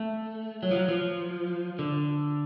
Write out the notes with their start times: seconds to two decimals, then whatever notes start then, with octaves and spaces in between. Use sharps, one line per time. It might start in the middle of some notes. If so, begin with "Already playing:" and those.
Already playing: A3
0.63 F#3
0.71 F3
0.76 F#3
0.88 F3
1.79 D3